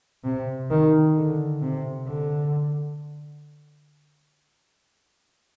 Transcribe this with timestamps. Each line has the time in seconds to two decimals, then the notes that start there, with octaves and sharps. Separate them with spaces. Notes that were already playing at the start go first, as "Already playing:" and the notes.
0.24 C3
0.70 D#3
1.17 D3
1.62 C3
2.07 D3